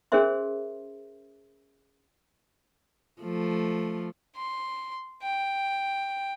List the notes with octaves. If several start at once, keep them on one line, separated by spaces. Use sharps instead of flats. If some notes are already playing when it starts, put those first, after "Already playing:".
C#4 G#4 A#4 C5 E5 C6
F3 A3
C6
G5